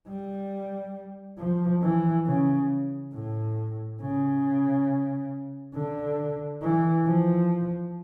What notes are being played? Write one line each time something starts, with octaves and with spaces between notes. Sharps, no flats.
G3
F3
E3
C#3
A2
C#3
D3
E3
F3